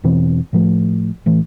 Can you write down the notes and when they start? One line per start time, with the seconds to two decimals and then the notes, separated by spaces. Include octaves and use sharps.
0.04 E2 B2 E3 C4
0.53 A2 F3 A3
1.26 A1 E3 A3